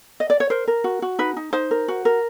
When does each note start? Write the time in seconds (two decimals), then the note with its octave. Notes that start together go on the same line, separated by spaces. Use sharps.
0.20 D#5
0.30 D5
0.40 C#5
0.50 A#4 C5
0.68 A#4
0.84 F#4
1.02 F#4
1.19 D#4 B4
1.37 D#4
1.53 D#4 C5
1.71 A#4
1.88 F#4
2.05 A#4